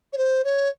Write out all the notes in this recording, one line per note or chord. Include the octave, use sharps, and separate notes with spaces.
C#5
C5
C#5